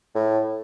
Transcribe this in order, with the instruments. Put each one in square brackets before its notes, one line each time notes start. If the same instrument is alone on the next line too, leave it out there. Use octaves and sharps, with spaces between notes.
[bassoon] A2